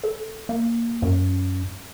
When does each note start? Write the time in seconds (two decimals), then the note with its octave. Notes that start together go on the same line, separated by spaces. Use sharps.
0.04 A4
0.49 A#3
1.02 F#2